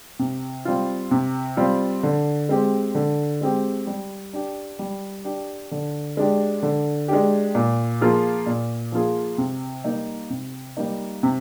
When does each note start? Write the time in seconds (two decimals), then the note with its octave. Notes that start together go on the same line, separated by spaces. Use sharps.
0.19 C3
0.65 G3 C4 F4
1.11 C3
1.57 G3 C4 F4
2.03 D3
2.49 G#3 C4 G4
2.95 D3
3.41 G#3 C4 G4
3.87 G3
4.33 D4 G4
4.79 G3
5.25 D4 G4
5.71 D3
6.17 G#3 D4 G4
6.63 D3
7.08 G#3 D4 G4
7.55 A#2
8.01 F3 A#3 F4 G#4
8.46 A#2
8.92 F3 A#3 F4 G#4
9.38 C3
9.84 G3 A#3 D#4
10.30 C3
10.77 G3 A#3 D#4
11.23 C3